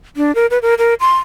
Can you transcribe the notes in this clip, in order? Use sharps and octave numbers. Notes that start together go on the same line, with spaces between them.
D4
A#4
B4
A#4
A#4
C6